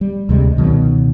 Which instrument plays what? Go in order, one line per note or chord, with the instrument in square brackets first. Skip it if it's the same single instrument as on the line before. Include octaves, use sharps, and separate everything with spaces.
[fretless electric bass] G3
D2 C3 G3 G#3
C#2 B2 D#3 F#3